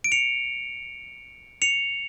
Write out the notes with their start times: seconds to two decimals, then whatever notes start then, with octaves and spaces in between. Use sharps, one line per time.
0.04 D7
0.12 C#7 F7
1.62 C#7 F7